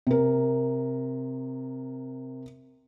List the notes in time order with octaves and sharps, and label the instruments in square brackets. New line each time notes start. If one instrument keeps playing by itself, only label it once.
[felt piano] C3 A#4